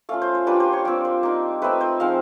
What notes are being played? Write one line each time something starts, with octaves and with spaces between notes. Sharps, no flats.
A3 C#4 F4 F5
C5
C5
G3 A#3 D4 F4 B4
C5
C#5
G3 C4 F4 D5
C5
A#3 D#4
A3 C4 D#4 B4
C5
F3 G#3 C4 D#4 F5